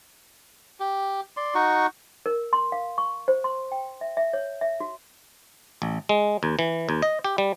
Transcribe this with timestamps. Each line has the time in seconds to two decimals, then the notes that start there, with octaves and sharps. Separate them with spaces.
0.80 G4
1.37 D5 C6
1.55 D#4 F#4 C#6
2.26 A#4
2.53 C6
2.72 F5
2.98 C#6
3.28 C5
3.44 C6
3.72 G5
4.01 E5
4.17 E5
4.33 C#5
4.61 E5
4.80 F#4
5.82 A1
6.09 G#3
6.43 D#2
6.59 E3
6.89 D#2
7.02 D#5
7.24 G4
7.38 G3